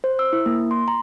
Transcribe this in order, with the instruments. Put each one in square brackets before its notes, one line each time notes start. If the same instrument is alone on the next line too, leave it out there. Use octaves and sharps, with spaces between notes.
[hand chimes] C5
E6
E4
A#3
C6
A#5